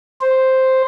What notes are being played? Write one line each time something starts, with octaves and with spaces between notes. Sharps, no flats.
C5